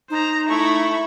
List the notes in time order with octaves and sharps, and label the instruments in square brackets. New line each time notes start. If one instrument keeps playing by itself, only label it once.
[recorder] D#4 [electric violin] C5 A#5
[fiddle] A3 [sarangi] E4 [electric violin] B5 C#6